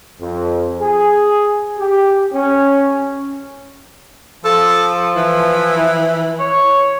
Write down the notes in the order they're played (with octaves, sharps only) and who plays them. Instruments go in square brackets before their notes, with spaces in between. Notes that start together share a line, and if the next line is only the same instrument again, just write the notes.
[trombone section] F2
G#4
G4
C#4
[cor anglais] F3 [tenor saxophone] A4
[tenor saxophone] E3
[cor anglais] C#5